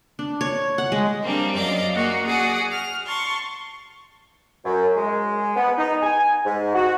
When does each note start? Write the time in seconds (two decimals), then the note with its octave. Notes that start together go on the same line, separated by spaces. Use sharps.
0.19 D4
0.41 C#5
0.78 F#5
0.92 G#3
1.24 G3 A#3 C4 D4
1.56 F#2 D5 D#5 F5
1.93 A#3 F#4 G#4
2.26 F#4 G#4 D5 F#5
2.71 F6
3.07 A5 C6 C#6
4.65 F#2
4.96 G#3
5.56 B3
5.78 D#4
6.02 G#5
6.45 G#2
6.75 F#4